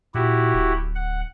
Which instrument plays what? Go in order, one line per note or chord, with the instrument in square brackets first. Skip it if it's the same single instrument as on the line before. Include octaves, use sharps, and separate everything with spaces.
[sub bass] A#2 [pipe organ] E4 F#4 G4
[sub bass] D1
[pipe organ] F#5